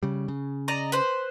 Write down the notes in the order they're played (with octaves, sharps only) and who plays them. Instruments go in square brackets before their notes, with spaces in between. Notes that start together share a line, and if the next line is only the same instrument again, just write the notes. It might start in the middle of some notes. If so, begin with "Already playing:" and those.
[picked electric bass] C#3 G3
C#3
[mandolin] D5 D#5 A#5
B4 C5